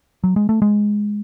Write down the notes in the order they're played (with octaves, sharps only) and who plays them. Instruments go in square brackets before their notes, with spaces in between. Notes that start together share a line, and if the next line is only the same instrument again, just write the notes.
[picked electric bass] F#3
G#3
A3
G#3